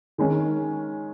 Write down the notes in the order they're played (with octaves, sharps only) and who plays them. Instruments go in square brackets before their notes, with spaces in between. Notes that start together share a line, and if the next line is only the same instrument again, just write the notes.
[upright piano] D#3 G#3 C#4